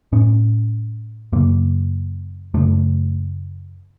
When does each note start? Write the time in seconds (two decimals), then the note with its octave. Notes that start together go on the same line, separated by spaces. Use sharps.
0.12 A2 C#4
1.33 F#2 C#3 A#3
2.54 F#2 C#3 A3